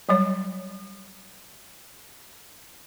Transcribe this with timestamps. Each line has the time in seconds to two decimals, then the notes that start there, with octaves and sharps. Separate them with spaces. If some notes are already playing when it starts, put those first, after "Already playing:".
0.09 F#3 G3 C#5